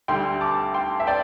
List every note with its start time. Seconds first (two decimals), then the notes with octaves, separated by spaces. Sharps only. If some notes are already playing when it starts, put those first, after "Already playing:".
0.08 D2 D3 G3 G5 C6
0.41 A5 D6
0.74 G5 C6
1.00 E5
1.07 D5 G5